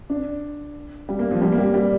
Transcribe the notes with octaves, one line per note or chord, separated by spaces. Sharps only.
D4
G3
A#3
F3
G3
A#3
G3
G3